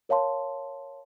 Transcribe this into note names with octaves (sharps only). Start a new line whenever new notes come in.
A#4 C#5 F5 A5 C6